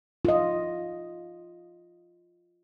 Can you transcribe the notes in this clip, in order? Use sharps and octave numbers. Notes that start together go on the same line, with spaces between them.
F4 D#5